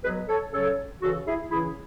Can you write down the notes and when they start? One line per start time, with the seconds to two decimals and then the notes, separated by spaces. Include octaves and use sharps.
0.04 B2 G#4 B4
0.08 F#3
0.29 A4 C#5
0.53 C#3 F#3 A4 C#5
1.03 C#3 E3 F#4 A4
1.27 E4 G#4
1.51 C#3 E3 E4 G#4